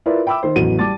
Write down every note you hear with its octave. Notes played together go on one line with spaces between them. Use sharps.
E4 F4 A#4 B4 D5 E5
E5 G5 B5 D6 E6
D#3 C5
A1 E2 F#3 F#4 D#7
G3 A5 D6 A6